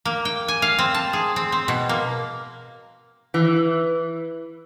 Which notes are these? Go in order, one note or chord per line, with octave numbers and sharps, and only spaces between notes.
A#3
G5
G#5
F5
C4
A5
G#4
C4
C4
B2
A#3
E3